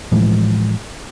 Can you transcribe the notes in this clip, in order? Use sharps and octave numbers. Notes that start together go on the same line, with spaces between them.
A2 E3 F3 G#3